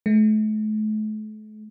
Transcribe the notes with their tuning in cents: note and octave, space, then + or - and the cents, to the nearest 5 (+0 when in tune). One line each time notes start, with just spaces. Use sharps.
A3 -40